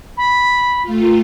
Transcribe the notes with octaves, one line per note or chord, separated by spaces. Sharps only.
B5
A3 F4